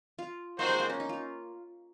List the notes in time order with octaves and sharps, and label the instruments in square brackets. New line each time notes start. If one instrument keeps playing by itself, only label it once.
[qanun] F4
[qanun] A#3 [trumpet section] C4 D#4 F#4 C5
[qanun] G#3
A#3
C#4
D#4
F4